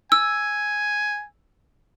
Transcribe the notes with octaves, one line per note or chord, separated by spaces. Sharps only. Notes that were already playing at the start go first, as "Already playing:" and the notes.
G#5 E6